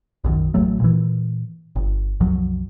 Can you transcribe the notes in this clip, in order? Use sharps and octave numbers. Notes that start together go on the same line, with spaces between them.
B1 F#2 D#3
A1 E2 F#3 A3
A#2 E3
G1
C2 F#2 F3 F#3